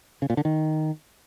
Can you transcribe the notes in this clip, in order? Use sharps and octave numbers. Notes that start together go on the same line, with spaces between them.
C#3
A#2
D3
D#3